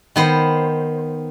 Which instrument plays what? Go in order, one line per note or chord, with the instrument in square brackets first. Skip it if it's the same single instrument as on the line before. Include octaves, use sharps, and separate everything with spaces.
[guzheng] D#3 B3 C5